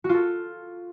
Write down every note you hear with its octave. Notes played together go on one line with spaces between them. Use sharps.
F#4
F4
A4